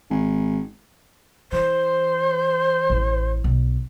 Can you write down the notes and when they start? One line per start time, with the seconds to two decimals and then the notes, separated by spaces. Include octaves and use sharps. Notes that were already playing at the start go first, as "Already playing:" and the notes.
0.10 G#1
1.52 E3 C5
2.90 A1
3.44 B1